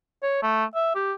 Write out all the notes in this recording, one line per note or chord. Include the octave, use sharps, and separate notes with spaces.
C#5
A3
E5
G4